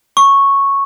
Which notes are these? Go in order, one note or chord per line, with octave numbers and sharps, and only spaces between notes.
C#6